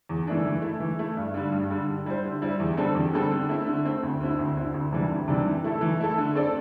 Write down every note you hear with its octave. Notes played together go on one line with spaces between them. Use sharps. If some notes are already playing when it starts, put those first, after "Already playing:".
E2
E3 A3 D4
E3
A3 E4
E3
A3 E4
G2
D3 G3
G2
D3 G3
D3
G3 E4 C5
D3
G3 E4 C5
E2
D3 G3 C4 A4
E2
D3 G3 C4 A4
D3
A3 C4 E4
D3
A3 C4 E4
D2
D3 C4 E4
D2
D3 C4 E4
D2
C3 E3 G3 D4
D2
C3 E3 G3 D4
E3
A3 E4 A4
E3
A3 E4 A4
D3
C4 A4 D5